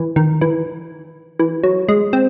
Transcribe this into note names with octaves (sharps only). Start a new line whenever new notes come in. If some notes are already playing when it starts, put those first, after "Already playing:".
Already playing: E3
D#3
E3
E3
F#3
G#3
C4